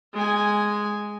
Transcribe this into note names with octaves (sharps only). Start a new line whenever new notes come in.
G#3 G#5